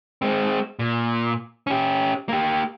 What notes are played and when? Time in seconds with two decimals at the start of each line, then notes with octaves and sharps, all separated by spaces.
0.22 G#3 C4
0.79 A#2
1.67 C#4 G4
2.29 A#3 G4